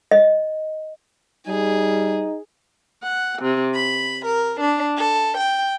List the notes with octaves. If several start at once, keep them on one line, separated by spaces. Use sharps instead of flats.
D#5
G3 D#4 G#4
F#5
C3
B5
A#4
D4
A4
G5